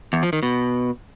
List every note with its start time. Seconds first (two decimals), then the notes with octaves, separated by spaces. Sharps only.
0.13 E2
0.23 F3
0.33 D#3
0.43 B2